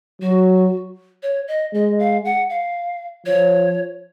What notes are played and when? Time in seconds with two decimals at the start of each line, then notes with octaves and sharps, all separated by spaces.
0.22 F#3 F#4
1.23 C#5
1.48 D#5
1.74 G#3 D#5
1.99 F5
2.25 F#5
2.50 F5
3.26 F3 C#5